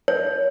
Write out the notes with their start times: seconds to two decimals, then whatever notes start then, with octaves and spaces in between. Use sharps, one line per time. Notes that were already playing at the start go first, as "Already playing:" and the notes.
0.08 C#5